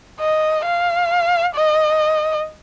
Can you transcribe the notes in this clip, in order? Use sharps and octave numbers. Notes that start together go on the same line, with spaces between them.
D#5
F5
D#5